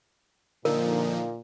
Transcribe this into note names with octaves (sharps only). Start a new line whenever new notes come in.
A#2 D3 F3 A#3 D#4 A#4